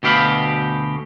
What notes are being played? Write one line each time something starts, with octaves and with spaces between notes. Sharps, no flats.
D2 B2 G4 F5 B5